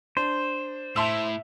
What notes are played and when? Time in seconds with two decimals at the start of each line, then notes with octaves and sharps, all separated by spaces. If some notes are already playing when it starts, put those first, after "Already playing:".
0.17 D4 C5
0.96 A2 E5 A5 C6 E6